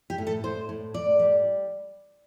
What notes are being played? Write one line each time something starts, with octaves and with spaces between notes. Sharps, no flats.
G4
A2
A4
A2 C5
A2
A2 D5
G3